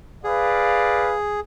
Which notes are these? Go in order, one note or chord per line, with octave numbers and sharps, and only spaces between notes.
G#4 B4 D5 F5